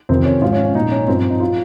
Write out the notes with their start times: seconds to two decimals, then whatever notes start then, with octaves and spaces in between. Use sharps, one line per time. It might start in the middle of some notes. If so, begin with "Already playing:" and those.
0.09 F2 C3 D#3 C4
0.25 C#4
0.42 G#2 F3 F4
0.53 C#4
0.64 C#4
0.75 A#2 F3 D#4
0.92 C#4
1.08 G2 F3 C4
1.19 C4
1.30 D#4
1.40 F3 F4